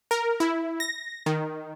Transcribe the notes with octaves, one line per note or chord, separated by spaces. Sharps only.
A#4
E4
A#6
D#3